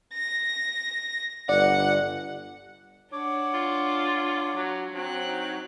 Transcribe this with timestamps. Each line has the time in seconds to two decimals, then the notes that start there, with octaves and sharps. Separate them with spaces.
0.14 A#6
1.49 G1 D5 F#5
3.12 D4 C#5 F#5 D6
3.54 F4
4.56 F#3
4.94 F#3 C4 F#6
5.27 D#4